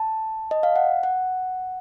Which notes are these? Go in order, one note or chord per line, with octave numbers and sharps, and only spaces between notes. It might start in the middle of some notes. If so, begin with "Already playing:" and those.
Already playing: A5
D#5
F5
F#5
F#5